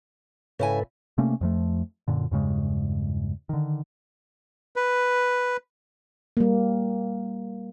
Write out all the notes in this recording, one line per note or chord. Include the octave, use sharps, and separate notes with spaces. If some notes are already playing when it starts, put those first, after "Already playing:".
G#2 C#3 E4 A4 B4 G#5
C3 A3 A#3 C#4
F2 F3 A3
F#2 A#2 D3
E2 G2 C#3 G#3
D3 D#3
B4
G3 A#3